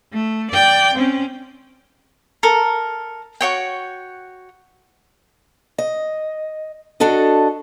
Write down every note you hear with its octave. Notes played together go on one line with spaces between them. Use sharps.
A3
D5 G5
C4 C#4
A4 A#4
F#4 C#5 G5
D#5
D4 F#4 A4 D#5